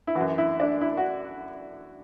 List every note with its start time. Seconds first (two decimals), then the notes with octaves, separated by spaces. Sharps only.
0.07 E4
0.15 E3 F#4
0.21 F#2
0.38 E4
0.60 D4
0.81 E4
0.97 F#4